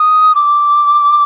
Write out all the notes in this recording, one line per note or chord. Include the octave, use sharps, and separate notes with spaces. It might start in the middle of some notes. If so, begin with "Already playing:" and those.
Already playing: D#6
D6